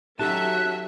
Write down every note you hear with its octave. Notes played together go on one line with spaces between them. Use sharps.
F#3 C#4 D#4 G4 A4 E5 A5 F#6